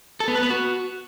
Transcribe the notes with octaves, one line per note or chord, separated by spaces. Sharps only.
A4
B3
B4
B3
F#4